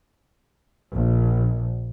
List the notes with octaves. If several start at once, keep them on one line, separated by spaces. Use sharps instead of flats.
A#1